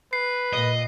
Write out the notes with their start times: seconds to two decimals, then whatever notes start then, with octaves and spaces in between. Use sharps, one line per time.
0.13 B4 C7
0.53 A#2 D#5